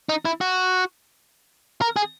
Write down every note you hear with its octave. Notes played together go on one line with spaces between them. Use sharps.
D#4
E4
F#4
A#4
G#4